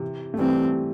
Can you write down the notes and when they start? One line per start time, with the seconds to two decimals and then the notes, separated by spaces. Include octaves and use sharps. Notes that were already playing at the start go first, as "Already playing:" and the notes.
Already playing: C3 E3
0.34 A3
0.38 E3 G3 C4